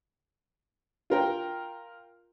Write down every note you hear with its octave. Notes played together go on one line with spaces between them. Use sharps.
F4 A#4 G5